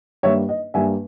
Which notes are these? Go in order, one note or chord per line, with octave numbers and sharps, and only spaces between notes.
G2 G3 A#3 C#5 E5
D#5
G2 G3 A#3 E5 G#5